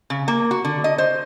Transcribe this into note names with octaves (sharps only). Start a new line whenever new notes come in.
C#3
A#3
F#4
D3
D#5
C5